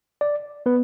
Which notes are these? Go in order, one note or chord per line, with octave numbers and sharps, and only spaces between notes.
D5
B3 B4